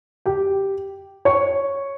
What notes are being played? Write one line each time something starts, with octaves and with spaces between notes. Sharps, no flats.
G4 G5
C#5 C#6